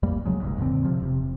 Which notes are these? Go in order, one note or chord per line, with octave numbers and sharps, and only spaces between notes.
A#1 F2 G3 A#3
B1 C#3 F#3 G#3
F1 B1 G#2
F2 A#2 D3 C4
C3 F3
E1 C3